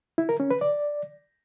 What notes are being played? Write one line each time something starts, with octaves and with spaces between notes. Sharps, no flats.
E4
A#4
C#4
B4
D5